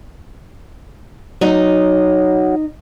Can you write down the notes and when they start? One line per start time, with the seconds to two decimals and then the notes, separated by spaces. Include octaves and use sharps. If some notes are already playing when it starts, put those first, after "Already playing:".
1.41 F#3 D#4 D#5